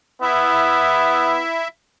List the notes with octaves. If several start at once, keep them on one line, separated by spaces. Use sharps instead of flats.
B3 E4 E5